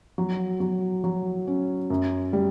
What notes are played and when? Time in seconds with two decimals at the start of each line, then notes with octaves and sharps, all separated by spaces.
0.18 F#3
0.60 F#3
1.04 F#3
1.47 C#4
1.90 F#2
2.33 G3